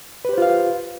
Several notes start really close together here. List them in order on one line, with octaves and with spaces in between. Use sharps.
B4 G4 C5 F4 F5